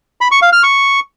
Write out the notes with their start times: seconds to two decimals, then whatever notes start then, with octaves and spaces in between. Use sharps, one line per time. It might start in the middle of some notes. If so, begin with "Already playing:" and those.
0.21 B5
0.32 C#6
0.42 F5
0.53 F6
0.63 C#6